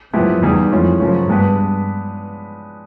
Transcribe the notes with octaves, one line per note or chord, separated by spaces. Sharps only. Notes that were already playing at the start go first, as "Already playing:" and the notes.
F#2 F3 G#3 B3 E4 G4
E2 D#3 G3 B3 D#4 G#4
F2 E3 G#3 C#4 F4
F#2 C#3 F3 G#3 C#4
G2 G#3 B3 D4 G4 B4